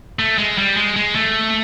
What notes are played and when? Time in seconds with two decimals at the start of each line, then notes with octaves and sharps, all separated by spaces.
0.19 A3
0.38 G#3
0.58 G3
0.77 G#3
0.96 G#3
1.15 A3